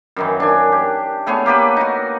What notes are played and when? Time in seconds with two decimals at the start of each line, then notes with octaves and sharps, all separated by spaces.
0.16 F#2 D#3 E3
0.40 D4 G#5
0.72 G4
1.26 A3 B3 G#4 C#5
1.46 A#3 G4 A4 B4
1.76 D#4 F#4